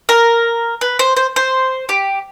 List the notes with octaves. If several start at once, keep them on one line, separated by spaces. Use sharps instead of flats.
A#4
B4
C5
C5
C5
G4